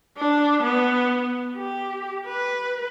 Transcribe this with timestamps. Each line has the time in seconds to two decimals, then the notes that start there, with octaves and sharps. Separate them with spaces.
0.17 D4
0.63 B3
1.56 G4
2.26 B4